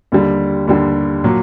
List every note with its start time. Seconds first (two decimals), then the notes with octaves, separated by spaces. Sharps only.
0.12 D#2 D3 G3
0.67 D#2 D3 G3
1.24 A#2 F#3